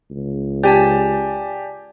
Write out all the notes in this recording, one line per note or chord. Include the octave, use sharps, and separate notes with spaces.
C#2
G4 D5 G#5 A5